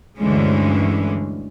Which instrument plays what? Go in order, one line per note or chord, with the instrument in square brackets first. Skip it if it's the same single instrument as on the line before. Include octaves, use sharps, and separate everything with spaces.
[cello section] D2 G2 D3 E3 G#3 C#4